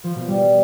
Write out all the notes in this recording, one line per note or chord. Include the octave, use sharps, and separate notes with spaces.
F3
B2
G3